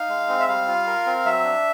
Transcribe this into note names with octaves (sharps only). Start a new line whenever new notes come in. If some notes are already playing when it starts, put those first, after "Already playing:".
Already playing: D#4 F5
G#3
C4
E5
G3 F5
F4
A#4
C4
F#3 E5
D4